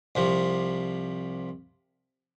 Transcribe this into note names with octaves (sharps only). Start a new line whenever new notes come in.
C2 C3 F3